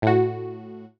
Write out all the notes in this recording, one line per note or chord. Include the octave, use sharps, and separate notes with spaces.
A2 F#4